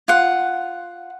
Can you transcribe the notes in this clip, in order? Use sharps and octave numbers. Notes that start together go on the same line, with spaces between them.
F4 F#5